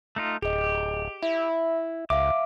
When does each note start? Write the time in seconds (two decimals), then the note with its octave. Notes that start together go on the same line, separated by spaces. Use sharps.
0.16 A3 D#4 F4
0.42 D1 G4 G#4 D#5
1.23 E4 E5
2.10 C#2 E5 F5 D6